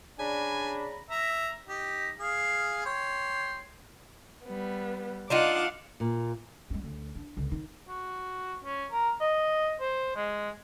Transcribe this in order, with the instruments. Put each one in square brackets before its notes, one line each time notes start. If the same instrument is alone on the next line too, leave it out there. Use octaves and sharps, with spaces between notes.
[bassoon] C#3 [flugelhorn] D4 [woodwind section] D5 A#5 B5 [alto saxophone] G#5
[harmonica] E5 A#5
D#4 G4
G#4 F5
C#5 G5 C6
[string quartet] G3 B3
[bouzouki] D4 D#4 F4 [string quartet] F5 F#5 D6
[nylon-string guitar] A#2
[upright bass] G#3 C#4
D2
D4
C#2 D3
D#3 D#4
[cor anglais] F#4
C#4
A#4
D#5
C5
G#3